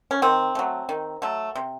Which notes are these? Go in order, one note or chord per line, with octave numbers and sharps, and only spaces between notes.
C#4
D#3 C4
F#3 A3
D#3
F#3 A3
C3